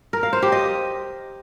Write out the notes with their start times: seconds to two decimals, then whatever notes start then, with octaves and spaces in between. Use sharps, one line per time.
0.13 A#4
0.23 F5
0.33 C5
0.42 G4
0.52 D#5